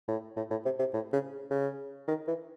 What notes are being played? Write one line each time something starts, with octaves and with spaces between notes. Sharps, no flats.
A2
A2
A2
C3
C3
A2
C#3
C#3
D#3
E3